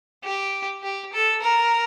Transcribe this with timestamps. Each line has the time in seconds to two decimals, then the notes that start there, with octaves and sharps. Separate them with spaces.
0.24 G4
0.83 G4
1.13 A4
1.42 A#4